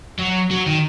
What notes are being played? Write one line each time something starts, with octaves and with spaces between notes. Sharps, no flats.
F#3
F#3
D#3